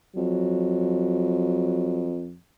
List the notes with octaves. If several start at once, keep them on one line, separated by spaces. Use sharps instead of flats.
F2 F#3